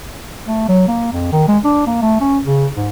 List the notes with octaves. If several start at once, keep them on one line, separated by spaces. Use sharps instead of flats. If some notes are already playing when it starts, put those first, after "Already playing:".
A3
F#3
A#3
F2
D#3
G#3
D4
A#3
A3
C#4
C#3
G#2